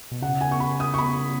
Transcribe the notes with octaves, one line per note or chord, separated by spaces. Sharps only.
B2
C#3 F#5
G#5
C#6
B5
D#6
C#6
B5